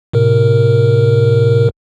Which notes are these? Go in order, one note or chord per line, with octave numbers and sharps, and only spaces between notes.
A2 C3 A#4